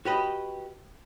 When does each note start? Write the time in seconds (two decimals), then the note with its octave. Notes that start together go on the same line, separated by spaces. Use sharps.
0.05 F#4 G4 B4 D#5